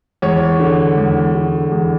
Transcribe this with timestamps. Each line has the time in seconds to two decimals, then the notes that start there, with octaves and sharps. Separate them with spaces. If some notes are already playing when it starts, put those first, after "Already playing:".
0.22 E2 C#5
0.60 D3
0.97 E2
1.35 D3
1.72 E2